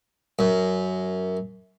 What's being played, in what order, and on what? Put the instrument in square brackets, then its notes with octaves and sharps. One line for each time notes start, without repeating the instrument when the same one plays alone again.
[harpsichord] F#2